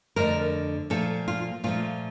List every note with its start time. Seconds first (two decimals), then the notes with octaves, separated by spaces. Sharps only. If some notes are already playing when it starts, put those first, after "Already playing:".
0.16 F2 D3 A3 A#4
0.90 A#2 F3 A3 A4
1.28 F4
1.64 A#2 F3 A3 F4